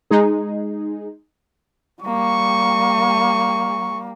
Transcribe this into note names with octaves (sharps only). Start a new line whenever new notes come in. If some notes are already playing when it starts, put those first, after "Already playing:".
G#3 D#4 G#4
G3 A#3 C#6